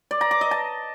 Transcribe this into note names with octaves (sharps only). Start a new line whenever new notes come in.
D5
A#5
D6
D#5
A5